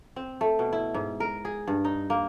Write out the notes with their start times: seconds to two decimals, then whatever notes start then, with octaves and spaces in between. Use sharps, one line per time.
0.16 C4
0.41 A3
0.59 B2
0.73 E4
0.94 G#2
1.20 A#4
1.45 G#4
1.67 G2
1.85 D#4
2.10 A#3